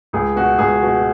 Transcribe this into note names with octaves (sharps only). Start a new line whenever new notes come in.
C#2 G#4
B2 F#4
C#2 G#4
B2